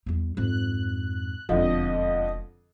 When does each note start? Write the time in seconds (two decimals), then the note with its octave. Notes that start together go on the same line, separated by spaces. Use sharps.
0.06 E2 G3
0.37 F2 G#2 F#6
1.49 E1 F2 D3 F3 D#5